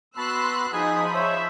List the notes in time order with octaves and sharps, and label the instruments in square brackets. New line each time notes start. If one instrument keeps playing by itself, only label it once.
[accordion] B3 F#4 B5 [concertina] A5 [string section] C6 E6 F#6
[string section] F3 B5 [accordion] D#4 D#6 [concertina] G#4 G#5
[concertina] C5 [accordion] C#5 [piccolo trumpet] E5